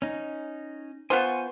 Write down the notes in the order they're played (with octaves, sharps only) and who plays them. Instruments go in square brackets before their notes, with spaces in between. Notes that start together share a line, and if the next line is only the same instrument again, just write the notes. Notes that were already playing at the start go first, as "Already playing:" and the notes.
[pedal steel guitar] C#4 D#4
[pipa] B3 F4 C5 [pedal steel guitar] G#5 C#6